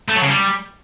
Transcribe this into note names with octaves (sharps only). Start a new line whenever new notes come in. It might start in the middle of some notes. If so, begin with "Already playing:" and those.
A3
F#3
C#3
G3